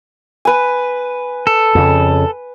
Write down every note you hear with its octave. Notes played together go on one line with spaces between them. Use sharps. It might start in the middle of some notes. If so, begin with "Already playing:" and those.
B4 G#5
A4
F2 C#3